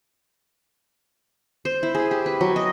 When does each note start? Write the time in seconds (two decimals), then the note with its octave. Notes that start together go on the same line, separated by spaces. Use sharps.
1.65 C5
1.83 E4
1.95 G#4
2.11 G4
2.26 B4
2.41 F#3
2.56 D#5